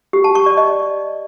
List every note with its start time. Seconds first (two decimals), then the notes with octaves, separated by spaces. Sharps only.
0.13 G4
0.24 A5
0.35 C#6
0.46 D5
0.57 D#5